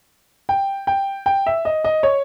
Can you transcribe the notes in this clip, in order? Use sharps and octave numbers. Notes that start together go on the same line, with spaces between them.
G5
G5
G5
E5
D#5
D#5
C#5